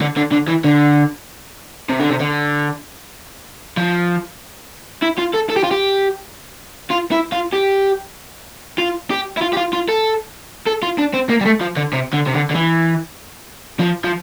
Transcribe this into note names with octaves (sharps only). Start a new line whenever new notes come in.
D3
D3
D3
E3
D3
C3
D3
C3
D3
F3
E4
F4
A4
A4
G4
F4
G4
F4
E4
F4
G4
F4
G4
E4
F4
G4
F4
F4
A4
A4
F4
D4
C4
A#3
G3
A3
F3
D3
C3
D3
C3
D3
D3
E3
F3
F3